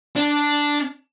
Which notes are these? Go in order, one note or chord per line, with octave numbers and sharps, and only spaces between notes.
D4